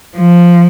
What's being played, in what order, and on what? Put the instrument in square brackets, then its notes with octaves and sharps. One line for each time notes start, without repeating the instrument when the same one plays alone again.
[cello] F3